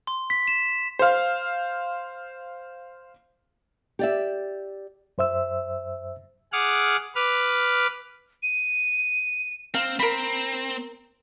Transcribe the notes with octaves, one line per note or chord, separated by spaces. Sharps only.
C6
B6
E7
C5 F5
G4 D5 E5
F#2 C5 E5 E6
G#4 F#5 D6 F6
B4 D6 F6
D#7
C4 F5 A#5
C4 A#4 B5